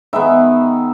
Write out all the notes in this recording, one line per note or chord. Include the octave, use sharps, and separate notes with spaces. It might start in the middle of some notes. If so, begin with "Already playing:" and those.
D#3 G#3 B3 E5